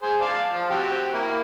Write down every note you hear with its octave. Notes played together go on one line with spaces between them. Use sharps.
G#4 C5
D5 F5 A5
F3 F4
C4 F#4 G4
A#3 E4